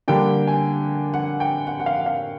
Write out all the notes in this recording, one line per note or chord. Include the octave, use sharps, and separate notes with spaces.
D3 G3 A#3 D4 G5
G#5
F#5
G5
F#5
F#5
F5
F5